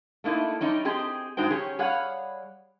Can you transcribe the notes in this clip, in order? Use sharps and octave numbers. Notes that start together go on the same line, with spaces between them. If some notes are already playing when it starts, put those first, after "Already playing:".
A3 A#3 D#4 E4
G3 C#4 D#4
C4 G4 G#4 D#5
G2 G#3 D#4 F#4 C5 G5
C#4 G4 G#4 C#5
G3 G#4 C#5 F5 F#5